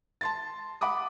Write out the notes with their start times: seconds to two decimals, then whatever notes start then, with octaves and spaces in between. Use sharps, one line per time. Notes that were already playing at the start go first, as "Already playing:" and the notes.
0.21 A5 C6 A6
0.81 F#5 B5 D6 D#6